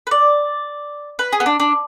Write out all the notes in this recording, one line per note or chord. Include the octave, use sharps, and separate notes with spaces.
B4
D5
B4
G#4
B3
D4
D4